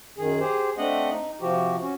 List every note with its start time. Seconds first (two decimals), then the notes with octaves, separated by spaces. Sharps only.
0.18 F#2 D#3 G#4
0.41 G4 G#4 C5
0.78 A3 C4 D4 D#5 F#5
1.11 D#4
1.41 C3 F3 F#4 G4
1.82 C#4 F#4